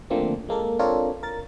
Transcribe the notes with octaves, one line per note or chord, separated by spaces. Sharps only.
D3 F3 A3 A#3 C4
G#3 A#3 A4 A#4
C4 D4 F4 A4 A#4 C#5
A#4 A6